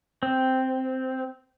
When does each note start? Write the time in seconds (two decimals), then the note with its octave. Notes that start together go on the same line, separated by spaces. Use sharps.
0.23 C4